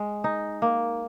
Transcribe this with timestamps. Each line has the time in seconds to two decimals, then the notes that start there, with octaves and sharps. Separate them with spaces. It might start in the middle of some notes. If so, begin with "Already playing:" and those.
Already playing: G#3
0.24 D#4
0.62 A#3